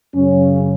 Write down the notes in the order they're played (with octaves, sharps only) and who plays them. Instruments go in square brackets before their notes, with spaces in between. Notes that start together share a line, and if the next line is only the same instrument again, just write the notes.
[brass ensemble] F#2 C#3 C#4